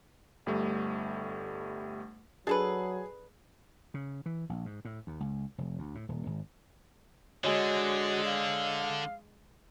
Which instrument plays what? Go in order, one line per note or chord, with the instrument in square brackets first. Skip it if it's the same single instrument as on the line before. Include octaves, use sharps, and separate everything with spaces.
[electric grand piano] G1 G3 A3
[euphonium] F#3 [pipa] D4 A4 B4 [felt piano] G#4
[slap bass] C#3
E3
A#1
G#2
A2
D#2
C#2
F1
D2
A2
D#1
G#1
[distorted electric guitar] D3 [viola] G#3 [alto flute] F#4 [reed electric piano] C#5 D#5 G#5
[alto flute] F5